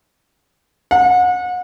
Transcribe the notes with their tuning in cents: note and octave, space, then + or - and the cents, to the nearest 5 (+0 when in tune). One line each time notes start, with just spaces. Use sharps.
F#5 -35